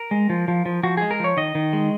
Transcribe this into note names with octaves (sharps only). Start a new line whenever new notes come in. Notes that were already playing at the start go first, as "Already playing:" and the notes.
Already playing: A#4
G#3
F3
F3
F3
F3 F#4
G#3 G#4
A#4
F3 C#5
D#3 D#5
D#3
G#3